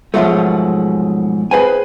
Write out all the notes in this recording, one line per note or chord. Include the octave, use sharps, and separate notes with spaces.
G#2 B2 D3 F3 F#3 A3
G#4 B4 C5 G#5